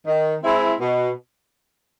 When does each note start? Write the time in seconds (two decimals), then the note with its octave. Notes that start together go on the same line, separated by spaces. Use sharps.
0.07 D#3
0.43 G#3 C4 E4
0.81 B2